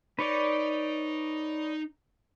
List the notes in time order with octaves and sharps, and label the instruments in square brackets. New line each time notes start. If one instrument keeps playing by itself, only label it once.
[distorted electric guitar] D#4 [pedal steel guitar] B4 C#5 D5